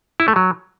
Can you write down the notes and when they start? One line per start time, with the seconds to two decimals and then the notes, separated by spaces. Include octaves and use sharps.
0.20 E4
0.28 A3
0.36 F#3